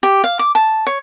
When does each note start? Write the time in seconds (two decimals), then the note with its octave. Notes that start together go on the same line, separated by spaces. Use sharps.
0.03 G4
0.24 F5
0.39 D6
0.55 A5
0.87 C#5